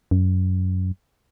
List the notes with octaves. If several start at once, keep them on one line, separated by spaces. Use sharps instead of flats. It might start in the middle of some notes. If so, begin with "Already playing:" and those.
F#2